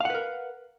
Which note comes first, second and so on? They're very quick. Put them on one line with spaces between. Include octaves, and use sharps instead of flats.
F5 F#5 B4 A#4